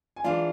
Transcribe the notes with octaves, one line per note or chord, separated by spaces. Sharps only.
G#5
E3 G#3 D4 F4 D5 F5